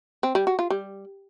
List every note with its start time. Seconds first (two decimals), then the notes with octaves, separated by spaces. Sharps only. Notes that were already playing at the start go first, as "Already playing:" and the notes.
0.23 C4
0.35 G3
0.47 F#4
0.59 F4
0.70 G3